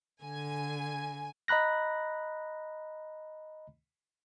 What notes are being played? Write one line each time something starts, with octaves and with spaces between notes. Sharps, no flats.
D3 G#5
D#5 A#5 B5 F#6 A#6